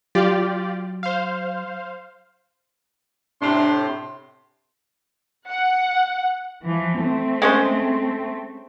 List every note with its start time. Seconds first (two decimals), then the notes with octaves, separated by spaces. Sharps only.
0.15 F#3 F4 G4 D5
1.03 C5 F5
3.42 A2 C3 D4 C6
5.49 F#5
6.64 E3 F3
7.03 A3 C4
7.42 G#3 C#4 C5